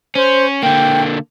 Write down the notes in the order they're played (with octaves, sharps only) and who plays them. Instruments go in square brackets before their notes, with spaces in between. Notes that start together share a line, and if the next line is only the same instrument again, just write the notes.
[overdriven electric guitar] C#4 [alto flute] C5
[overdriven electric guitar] D3 A#3 [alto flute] G5